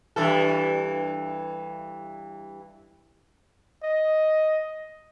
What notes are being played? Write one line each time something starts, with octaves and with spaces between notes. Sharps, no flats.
G2 E3 A4
D#5